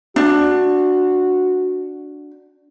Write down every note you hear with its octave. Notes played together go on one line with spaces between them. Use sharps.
D4 F#4